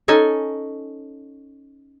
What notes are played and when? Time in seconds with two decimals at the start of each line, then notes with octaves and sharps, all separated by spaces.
0.08 C#4 D#4 A4 G#5